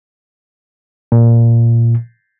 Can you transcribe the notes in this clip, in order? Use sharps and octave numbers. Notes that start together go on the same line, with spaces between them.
A#2